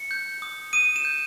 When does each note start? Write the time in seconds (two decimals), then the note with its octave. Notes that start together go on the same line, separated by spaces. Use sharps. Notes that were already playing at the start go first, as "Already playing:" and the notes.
Already playing: C#7
0.11 G6
0.42 D#6
0.73 D#6 D#7
0.96 E7
1.05 G6